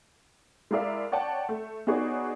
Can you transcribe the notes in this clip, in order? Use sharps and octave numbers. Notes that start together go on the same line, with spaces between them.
G#3 E4 A#4 D5 E5 F5
C#5 D5 F#5 G5 A5
A3
B3 D#4 F#4 G#4 C#5 D5